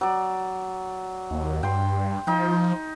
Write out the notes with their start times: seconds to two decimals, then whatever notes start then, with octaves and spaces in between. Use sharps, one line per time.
0.01 F#3 D5
1.31 D#2
1.63 G2 G5 C6
2.27 F3 D#4 G5